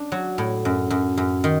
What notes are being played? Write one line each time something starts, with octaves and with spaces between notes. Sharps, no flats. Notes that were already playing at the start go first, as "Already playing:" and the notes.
Already playing: D4
F#3
A2
F#2
F#2
F#2
D#3